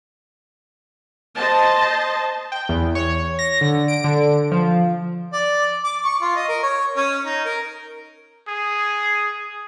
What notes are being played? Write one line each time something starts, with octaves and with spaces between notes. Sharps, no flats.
C5 D#5 A5
G5
E2
C#5
A#6
D3
D7
D3
F3
D5
D6
C#6
F4
D#5
A#4
C#5
C#4
D#4
A#4
G#4